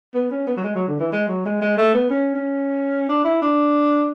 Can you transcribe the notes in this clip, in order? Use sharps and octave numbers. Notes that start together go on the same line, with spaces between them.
B3
C#4
B3
F#3
G#3
F#3
D3
E3
G#3
F#3
G#3
G#3
A3
B3
C#4
C#4
D4
E4
D4